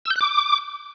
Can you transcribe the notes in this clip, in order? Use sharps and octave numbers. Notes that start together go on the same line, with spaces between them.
E6
G6
F#6
D6